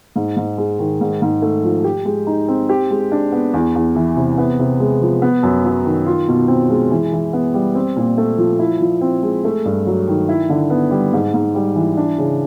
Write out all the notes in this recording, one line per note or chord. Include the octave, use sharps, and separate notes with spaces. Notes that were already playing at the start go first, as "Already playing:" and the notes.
G#2
G#2
G#3
D#3
G#2
G#2
A3
F3
G4
G#3
D#4
C4
G4
G#3
D4
B3
E2
E2
E3
C3
B3
C3
G#3
F3
B3
F#2
F#3
D#3
F4
B2
C4
G#3
E3
E3
B3
G3
C4
A#2
A3
F3
E4
F3
C4
G#3
A3
G2
F#3
D#3
E4
D3
B3
G3
G#2
G#2
G3
E3
D4
C#3